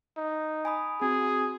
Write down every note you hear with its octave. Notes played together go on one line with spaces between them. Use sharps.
D#4
G#5 B5 D#6
C4 F#4 G#4